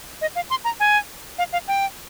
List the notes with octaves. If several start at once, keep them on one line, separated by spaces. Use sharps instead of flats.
D#5
F5
C6
A#5
G#5
F5
F5
G5